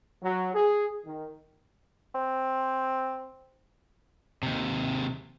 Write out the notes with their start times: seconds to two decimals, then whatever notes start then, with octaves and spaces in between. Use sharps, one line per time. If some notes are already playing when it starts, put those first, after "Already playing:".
0.22 F#3
0.54 G#4
1.05 D#3
2.15 C4
4.43 D#2 C3